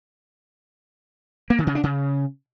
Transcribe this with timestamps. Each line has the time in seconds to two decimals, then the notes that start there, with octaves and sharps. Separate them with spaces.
1.50 A#3
1.59 D#3
1.67 C#3
1.75 D4
1.83 C#3